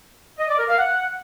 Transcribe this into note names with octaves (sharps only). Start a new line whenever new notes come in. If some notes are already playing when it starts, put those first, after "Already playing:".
D#5
D5
A#4
F5
F#5